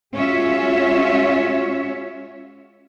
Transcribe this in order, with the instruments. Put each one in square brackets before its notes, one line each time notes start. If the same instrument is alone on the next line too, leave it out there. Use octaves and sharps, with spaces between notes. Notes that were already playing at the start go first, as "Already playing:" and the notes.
[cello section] G#3 C#4 F4 F#4 C#5 E5